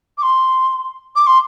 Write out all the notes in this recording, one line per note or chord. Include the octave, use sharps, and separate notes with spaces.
D6
C6
D6
C6